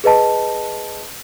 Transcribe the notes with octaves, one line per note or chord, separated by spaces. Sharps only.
G#4 B4 D#5 A5